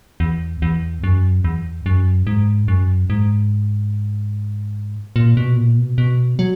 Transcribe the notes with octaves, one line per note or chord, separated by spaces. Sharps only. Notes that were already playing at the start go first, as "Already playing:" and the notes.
E2
E2
F#2
E2
F#2
G#2
F#2
G#2
A#2
B2
A#2
B2
B2
F#3